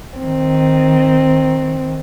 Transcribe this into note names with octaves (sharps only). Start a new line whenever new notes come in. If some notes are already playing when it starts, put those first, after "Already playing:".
D#3 C4